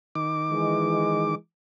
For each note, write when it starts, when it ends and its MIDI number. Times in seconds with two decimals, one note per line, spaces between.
0.15 1.35 51
0.15 1.35 86
0.50 1.34 52
0.50 1.34 56